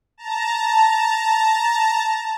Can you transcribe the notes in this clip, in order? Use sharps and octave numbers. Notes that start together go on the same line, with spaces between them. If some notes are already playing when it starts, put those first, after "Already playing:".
A5 A#5